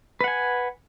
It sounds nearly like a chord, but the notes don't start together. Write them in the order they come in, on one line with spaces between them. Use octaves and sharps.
B4 F#5 G#5